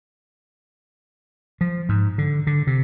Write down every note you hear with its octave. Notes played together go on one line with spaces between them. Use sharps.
F3
G#2
D3
D3
C3